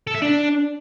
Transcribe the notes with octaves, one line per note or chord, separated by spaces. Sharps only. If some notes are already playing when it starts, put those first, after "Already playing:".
A4
E5
D4